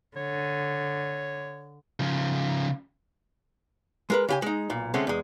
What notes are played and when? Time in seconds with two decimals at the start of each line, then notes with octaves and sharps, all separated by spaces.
0.16 D3 C#5
2.00 C#3 F3
4.10 G#3 A#4 B4
4.29 C#3 G4 G#5
4.42 G#3 D#4
4.70 B1 A#2
4.94 D3 G#3 A3 C4 C#4
5.07 E2 G#3